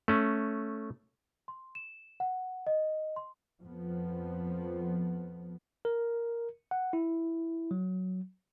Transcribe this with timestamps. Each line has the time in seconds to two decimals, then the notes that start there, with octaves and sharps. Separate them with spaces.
0.08 A3 C#4
1.48 C6
1.75 E7
2.20 F#5
2.67 D#5
3.16 C6
3.62 F2 F3 B3
5.85 A#4
6.71 F#5
6.93 E4
7.71 F#3